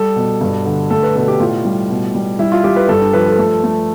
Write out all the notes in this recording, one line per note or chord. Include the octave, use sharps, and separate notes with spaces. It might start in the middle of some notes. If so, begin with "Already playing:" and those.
Already playing: G3 A4
B2
G2
D3
A3 A4
B4
B2 A4
G4
A2 F4
G3
B2
G3
G3 E4
F4
G3 G4
B4
G2 A4
D4
F3 B4
A4
A3
A3